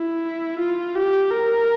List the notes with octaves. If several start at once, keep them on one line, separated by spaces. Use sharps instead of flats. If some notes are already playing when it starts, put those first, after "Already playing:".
Already playing: E4
F4
G4
A#4